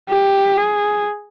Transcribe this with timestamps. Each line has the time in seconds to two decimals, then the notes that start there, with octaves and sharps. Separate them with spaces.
0.10 G4
0.57 G#4